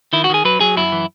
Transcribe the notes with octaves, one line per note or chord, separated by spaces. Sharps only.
D#3 E4
F#4
D#3 G#4
F#3 B4
F#3 G#4
F#2 E4
E3